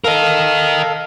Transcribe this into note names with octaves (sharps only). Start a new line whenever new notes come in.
A4 A#4 D#5 F5